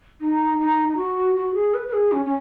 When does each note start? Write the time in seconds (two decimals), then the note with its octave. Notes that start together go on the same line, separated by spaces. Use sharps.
0.20 D#4
0.59 D#4
0.88 D#4
0.96 F#4
1.35 F#4
1.54 G#4
1.74 B4
1.88 B4
1.92 G#4
2.12 C#4
2.25 C#4